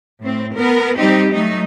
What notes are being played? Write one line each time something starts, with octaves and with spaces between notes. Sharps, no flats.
A2 C4
B3 A#4
G3 C4 D#4 G4
F#3 A3 D#4